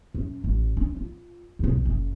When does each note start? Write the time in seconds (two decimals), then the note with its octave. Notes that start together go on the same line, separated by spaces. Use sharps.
0.14 F#2
0.44 A1
0.77 D4
0.96 F4
1.59 B1 E2
1.85 F#1